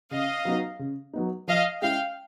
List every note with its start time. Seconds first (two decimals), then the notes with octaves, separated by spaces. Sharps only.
0.11 C#3 D#5 F5
0.45 F#3 B3 D#4
0.79 C#3
1.13 F#3 B3 D#4
1.48 F3 D#5 F5
1.82 G#3 C#4 E4 F5 G5